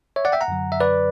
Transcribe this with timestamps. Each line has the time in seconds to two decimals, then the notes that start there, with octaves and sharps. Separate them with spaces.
0.16 C#5 E5
0.25 D5 F#5
0.32 E5 G5
0.41 F#5 A#5
0.48 F#2 D3 F#3
0.72 E5
0.80 B4 D5